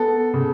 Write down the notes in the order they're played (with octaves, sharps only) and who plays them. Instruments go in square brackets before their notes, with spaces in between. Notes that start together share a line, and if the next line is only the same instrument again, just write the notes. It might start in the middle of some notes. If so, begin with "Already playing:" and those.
Already playing: [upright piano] B3 A4
C#3